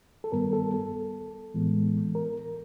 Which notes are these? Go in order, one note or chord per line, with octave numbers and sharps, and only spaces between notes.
A4
G2 D#3 G3 B3 A#4
A4
A4
A2 E3 G#3 B3
A#4